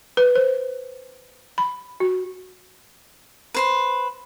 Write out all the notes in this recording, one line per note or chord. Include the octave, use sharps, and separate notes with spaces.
B4
C5
B5
F#4
B4 C5 B5